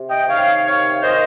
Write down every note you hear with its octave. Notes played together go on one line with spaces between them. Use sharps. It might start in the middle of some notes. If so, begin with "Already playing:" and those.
Already playing: C3
D#5 G5
C3 D#3 C#5 F5
C#5 F5
C3 D#3 C5 D#5